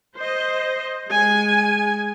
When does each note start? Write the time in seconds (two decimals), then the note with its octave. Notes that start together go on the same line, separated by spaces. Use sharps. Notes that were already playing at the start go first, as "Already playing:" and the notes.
0.17 C5 D#5
1.10 G#3 G#5